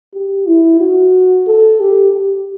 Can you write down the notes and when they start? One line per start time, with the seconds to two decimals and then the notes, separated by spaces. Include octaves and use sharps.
0.14 G4
0.47 E4
0.80 F#4
1.47 A4
1.80 G4
2.13 G4